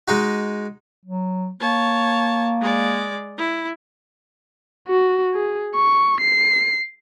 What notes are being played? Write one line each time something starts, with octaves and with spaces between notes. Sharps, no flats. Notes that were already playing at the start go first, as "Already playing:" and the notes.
G#3 D#4 F#4
F#3
A#3 C#5 A5
G#3 D5
E4
F#4
G#4
C#6
C7